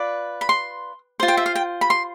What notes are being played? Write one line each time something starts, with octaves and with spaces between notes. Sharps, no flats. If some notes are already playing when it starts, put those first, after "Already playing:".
Already playing: F4 B4 D5
B5
C6
F4 C5
G5
E5
F5
G5
B5
C6